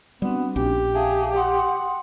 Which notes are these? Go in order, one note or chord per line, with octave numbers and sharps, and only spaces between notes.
G3 B3 C4 D4 F#4
A#1 C#4 G4
G#4 E5 F5 A5
F#5 G5 C6 D#6